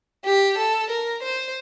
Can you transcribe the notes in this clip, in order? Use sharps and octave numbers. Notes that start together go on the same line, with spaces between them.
G4
A4
A#4
C5